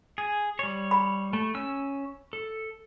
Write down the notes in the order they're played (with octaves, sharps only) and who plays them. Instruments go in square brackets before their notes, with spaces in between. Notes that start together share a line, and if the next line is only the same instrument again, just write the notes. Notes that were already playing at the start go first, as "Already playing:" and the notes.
[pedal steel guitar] G#4
G3 C#5
[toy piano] B5
[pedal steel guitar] A3
C#4 E6
A4